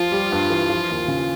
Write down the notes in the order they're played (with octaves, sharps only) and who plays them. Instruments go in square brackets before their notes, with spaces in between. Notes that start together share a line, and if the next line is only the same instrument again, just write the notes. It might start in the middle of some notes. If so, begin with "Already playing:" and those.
Already playing: [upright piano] F3 [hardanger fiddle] F4
[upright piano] G3
G2
E3
F3
D#2
C#3